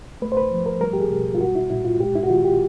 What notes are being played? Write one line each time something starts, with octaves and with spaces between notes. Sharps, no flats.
A3 B4
C5
B4
F3
A#4
G3 A#4
G4
G#4
B2
F4
G3 F#4
E4
A#2 E4
F4
G#3 G4
E4
F#4
D#3 F4
G4